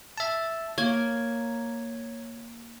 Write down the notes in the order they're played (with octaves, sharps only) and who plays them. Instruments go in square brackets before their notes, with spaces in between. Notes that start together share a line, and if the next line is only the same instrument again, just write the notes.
[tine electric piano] E5 A5
[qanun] A#3 [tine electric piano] C#5 G#6